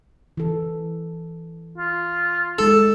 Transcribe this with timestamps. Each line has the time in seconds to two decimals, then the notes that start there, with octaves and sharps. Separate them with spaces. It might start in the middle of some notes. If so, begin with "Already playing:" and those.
0.37 E3 A4
1.78 F4
2.59 G#3 D#4 A4